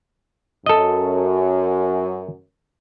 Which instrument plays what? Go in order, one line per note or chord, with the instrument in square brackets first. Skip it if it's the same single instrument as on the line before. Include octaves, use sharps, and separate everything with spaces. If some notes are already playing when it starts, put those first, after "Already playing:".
[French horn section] F#2 [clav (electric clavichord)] A4 D#5